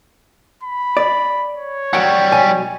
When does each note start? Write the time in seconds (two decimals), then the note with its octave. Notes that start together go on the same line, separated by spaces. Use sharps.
0.63 B5
0.97 D5
1.55 C#5
1.93 F#3 G3 F#5 G5
2.32 B1 G#5